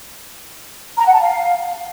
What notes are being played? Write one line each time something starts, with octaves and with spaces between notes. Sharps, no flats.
A#5
F#5
A5
F5